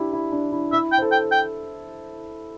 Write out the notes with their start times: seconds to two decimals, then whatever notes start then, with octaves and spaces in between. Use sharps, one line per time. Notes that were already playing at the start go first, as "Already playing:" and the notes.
Already playing: D4 E4 G4
0.13 E4
0.32 D4
0.52 E4
0.72 E4 E5
0.92 G5
0.98 C5
1.02 A4
1.12 G5
1.31 G5